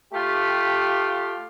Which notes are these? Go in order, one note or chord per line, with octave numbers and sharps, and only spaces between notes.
A3 F4 G4